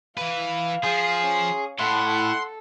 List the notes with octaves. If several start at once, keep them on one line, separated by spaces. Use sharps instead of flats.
E3 B4 F5
F3 G#4 C6
C#4
A2 E4 A4 F#5 C6